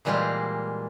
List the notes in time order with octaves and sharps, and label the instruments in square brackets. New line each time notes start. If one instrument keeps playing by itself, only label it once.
[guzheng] A#2 E3 G3 G#3 F4 C5